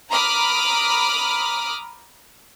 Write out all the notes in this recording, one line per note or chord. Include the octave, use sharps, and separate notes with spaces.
A#5 B5 D6 D#6 F6